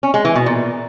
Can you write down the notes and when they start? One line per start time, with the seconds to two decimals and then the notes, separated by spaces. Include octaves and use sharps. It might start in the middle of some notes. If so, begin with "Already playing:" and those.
0.03 C#4
0.14 G#3
0.25 E3
0.35 B2
0.46 A#2